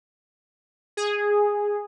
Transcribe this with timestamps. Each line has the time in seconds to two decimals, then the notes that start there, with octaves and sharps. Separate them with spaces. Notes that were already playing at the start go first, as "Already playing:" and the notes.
0.97 G#4